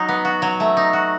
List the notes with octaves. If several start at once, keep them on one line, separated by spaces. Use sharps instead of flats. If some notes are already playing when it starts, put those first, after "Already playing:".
Already playing: F#3 D#4
B3
F#4
F#3
A3
D#4
F#4